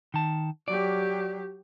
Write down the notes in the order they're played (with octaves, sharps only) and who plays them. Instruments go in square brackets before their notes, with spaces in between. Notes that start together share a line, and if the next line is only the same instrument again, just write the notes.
[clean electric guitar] D#3 A5
[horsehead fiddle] F#3 G4 [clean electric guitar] D5